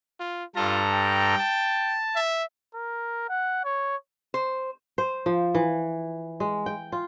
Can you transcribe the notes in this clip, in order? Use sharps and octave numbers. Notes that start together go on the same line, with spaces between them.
F4
G2 F4 A4 A#5
G5
A5
E5
A#4
F#5
C#5
C5
C5
F3
E3
G#3
G5
F4